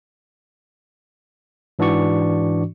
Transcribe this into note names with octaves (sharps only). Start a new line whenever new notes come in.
G#2 E3 D4 F#4 D5 C#6